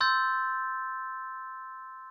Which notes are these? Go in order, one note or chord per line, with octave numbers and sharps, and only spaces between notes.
C6 E6 G6 A6